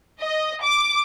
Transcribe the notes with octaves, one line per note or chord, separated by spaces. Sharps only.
D#5
D6